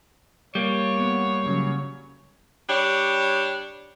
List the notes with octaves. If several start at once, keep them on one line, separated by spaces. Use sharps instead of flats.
G3 A#3 C#5
B3
C#3 F#3
G3 D4 C#5